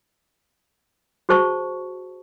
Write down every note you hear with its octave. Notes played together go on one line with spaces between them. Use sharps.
F#4 G#4 C5 A5 C#6